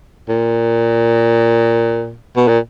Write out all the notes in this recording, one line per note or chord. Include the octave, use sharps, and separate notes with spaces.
A#2
B2
A#2